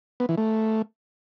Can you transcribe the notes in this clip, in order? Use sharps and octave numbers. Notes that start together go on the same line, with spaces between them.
B3
E3
A3